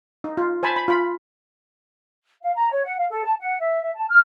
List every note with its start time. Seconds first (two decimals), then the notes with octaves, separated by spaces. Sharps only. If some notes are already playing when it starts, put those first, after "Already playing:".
0.24 D#4
0.37 F4
0.63 C5 G#5 A5 B5
0.76 B5
0.88 F4 B5
2.43 F5
2.56 A#5
2.70 C#5
2.84 F#5
2.97 F5
3.09 A4
3.24 A5
3.39 F#5
3.59 E5
3.81 E5
3.95 A5
4.10 F6